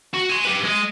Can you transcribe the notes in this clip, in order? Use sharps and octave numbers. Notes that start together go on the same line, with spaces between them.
F#4
G#5 C6
G4 B4
G#3 D#5